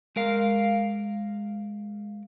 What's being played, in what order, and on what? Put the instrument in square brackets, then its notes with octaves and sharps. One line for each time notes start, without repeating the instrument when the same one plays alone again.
[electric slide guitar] G#3 A#4 F5